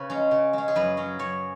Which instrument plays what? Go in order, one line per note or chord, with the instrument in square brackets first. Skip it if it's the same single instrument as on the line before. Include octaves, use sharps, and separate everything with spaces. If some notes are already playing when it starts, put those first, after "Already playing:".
Already playing: [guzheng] C#3 B4 C#5
G#3 C#4
C#3
G#3 C#4
G#4
F#2 B4
F#3 C#4
F#2 C#5